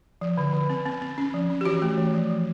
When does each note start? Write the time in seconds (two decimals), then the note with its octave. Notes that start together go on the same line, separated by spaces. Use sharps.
0.21 F3
0.38 D3
0.53 D3
0.70 C4
0.86 C4
1.01 C4
1.18 C#4
1.34 F3
1.50 C#4
1.61 G4
1.65 E3 F#4
1.82 A3
1.98 E3
2.14 F3
2.30 F3